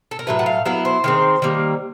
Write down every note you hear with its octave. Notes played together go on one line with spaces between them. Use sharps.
A4
A#4
A2 F#3 A3 B4
F#5
F5
F#3 B3 E4 F5
C5
D#3 G#3 C4
D#3 G3 A#3